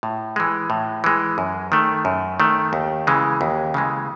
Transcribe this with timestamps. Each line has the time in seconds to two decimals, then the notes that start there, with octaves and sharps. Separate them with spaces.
0.03 A2
0.36 E3 G#3
0.70 A2
1.04 E3 G#3
1.38 F#2
1.72 D#3 A3
2.05 F#2
2.40 D#3 A3
2.73 D#2
3.07 C#3 E3 G#3
3.41 D#2
3.74 C#3 E3 G#3